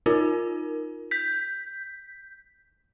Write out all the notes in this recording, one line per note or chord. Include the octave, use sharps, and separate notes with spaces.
D#4 F4 A#4
G6 B6